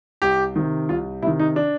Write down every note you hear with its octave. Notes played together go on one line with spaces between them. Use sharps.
C2 G4
C3 D#3
C2 F4
C3 D#3 E4
D#4
D4